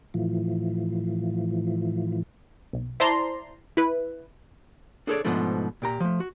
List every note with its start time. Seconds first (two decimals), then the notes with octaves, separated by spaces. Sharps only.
0.14 A2 E3 F3
2.73 B1
3.00 E4 C5 D5 A5 A#5 C6
3.77 E4 B4
5.07 D4 G#4 A4 B4 C#5 D5
5.25 G#2 B2 F3 A3 D4
5.82 A#2 G4 A#5
6.00 F3 A3
6.20 F#4